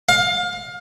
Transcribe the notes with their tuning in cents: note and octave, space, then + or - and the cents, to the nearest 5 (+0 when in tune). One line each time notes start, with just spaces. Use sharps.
F5 +25